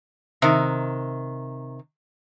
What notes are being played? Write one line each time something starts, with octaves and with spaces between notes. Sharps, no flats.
C3 D#3